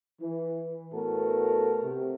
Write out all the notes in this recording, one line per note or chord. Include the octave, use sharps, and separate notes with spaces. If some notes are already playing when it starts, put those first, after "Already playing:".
E3
A2 A3 B3 F#4 A4 A#4
C3